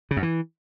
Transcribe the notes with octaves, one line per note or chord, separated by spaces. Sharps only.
C#3
F#2
E3